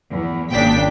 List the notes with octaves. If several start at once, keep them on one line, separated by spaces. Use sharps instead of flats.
E2
G#1 A#2 C#3 D4 G5 B6